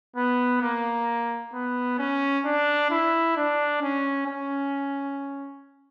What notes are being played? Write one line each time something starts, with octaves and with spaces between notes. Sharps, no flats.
B3
A#3
B3
C#4
D4
E4
D4
C#4
C#4